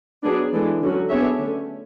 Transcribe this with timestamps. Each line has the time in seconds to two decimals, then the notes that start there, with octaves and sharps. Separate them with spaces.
0.24 F#3 B3 D4 G#4
0.53 E3 G#3 D4 A4
0.81 D3 F#3 C#4 F#4
1.10 B3 D4 G#4 C#5 E5
1.38 D3 A3 C#4